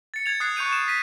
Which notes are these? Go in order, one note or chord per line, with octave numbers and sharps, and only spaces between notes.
A6 C#7
G#6 A6 F7
D#6 F#6 G#6 C7
C#6 F#6 G6 C#7 D#7 F7
E7
B6 D#7